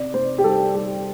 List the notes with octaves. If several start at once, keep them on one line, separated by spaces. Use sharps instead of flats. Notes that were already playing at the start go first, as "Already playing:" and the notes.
Already playing: C3 D5
C3 C5
G4
G3 A4
G3 G4